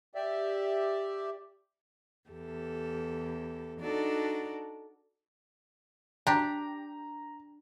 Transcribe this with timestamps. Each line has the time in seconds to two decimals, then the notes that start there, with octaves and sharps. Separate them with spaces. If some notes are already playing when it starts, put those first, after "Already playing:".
0.15 G4 D5 E5
2.30 E2 G4 A4
3.80 D4 D#4 F#4 A4 D5
6.27 D4 G4 A#5